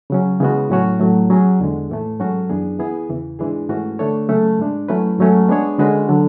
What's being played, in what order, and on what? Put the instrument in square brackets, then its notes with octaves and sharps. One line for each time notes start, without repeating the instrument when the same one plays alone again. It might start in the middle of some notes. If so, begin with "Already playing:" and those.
[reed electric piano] C#3 F#3 C#4
C#3 E3 G#3 B3 F#4
A2 F#3 C#4 F#4 C#5
A2 F#3 A3
F#3 C#4 G#4
E2 D3 G#3
A2 E3 A3
G#2 F#3 C#4 F#4 A4
F#2 E3 B3 D4 G#4
E3 B3 E4 G#4
E2 C#3 E3
G#2 E3 G#3 D4 G#4
G#2 E3 A3 C#4 F#4
D3 A3 D4 A4 C#5
C#3 F#3 A3 C#4
G#2 G#3 D4
F#3 A3 C#4 E4 B4
G#2 F#3 A3 C#4
G#3 B3 D4 G#4 C#5
D3 G#3 C#4 F#4 B4
D3 F#3